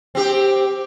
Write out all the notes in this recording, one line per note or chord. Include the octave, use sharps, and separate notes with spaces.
C4 G4